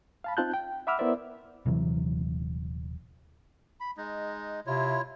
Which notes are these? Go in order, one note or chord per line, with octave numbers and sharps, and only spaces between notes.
F5 A5 B5
C4 D#4 F4 A5 F#6 G6
G5
E5 F#5 B5 D6 E6 F6
B3 E4 A#4 C5 D5 E5
D#1 C3 E3 F#3
B5
G#3 D#4
C3 E4 F4 C#5